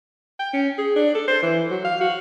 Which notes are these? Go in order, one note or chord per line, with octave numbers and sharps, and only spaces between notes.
G5
C#4
G#4
D4
A4
C5
E3
F#3
F5
F#4